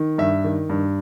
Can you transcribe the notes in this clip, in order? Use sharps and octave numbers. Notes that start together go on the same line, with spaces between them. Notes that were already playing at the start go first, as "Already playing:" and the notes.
Already playing: D#3
G2 E5
D#3
G2